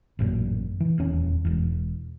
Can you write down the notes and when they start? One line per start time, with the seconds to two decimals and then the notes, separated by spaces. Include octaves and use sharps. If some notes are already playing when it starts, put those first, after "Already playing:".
0.19 A1 F#2 A#2
0.80 E3
0.98 D#1 E2 C#4
1.45 E1 E2